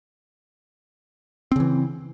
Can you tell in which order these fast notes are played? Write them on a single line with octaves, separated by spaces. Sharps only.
C4 C#3 E3